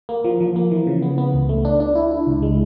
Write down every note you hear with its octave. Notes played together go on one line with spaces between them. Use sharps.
A#3
F3
F3
A#3
E3
C#3
B3
B3
C#2
A3
D4
D4
E4
E4
C#2
G#3